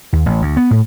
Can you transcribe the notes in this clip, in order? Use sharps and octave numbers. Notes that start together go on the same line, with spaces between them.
D#2
A1
D2
B3
A2